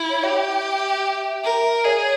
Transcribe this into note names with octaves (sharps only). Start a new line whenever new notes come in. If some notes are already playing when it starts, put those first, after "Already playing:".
Already playing: E4
C#5
G4 E5
A#4
G#4 C#5